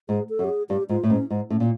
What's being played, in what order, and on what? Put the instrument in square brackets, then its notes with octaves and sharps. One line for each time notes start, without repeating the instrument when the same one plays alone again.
[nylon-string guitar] G#2 [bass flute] G#4
[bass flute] A4
[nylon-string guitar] F#2
[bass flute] G4
G#4
[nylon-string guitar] G2 [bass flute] G4
[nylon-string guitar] G#2 [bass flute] F4
[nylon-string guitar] A2
[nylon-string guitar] G#2 [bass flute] C#4
[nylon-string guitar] G#2
[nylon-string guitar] A2 [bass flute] C#4
[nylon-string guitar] A#2